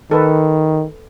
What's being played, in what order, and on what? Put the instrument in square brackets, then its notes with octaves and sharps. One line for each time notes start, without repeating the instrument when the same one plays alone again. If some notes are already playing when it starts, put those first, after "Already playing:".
[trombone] D#3 [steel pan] A4 B4